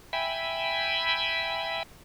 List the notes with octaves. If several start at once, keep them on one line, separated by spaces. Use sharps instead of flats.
E5 G5 G#5 B5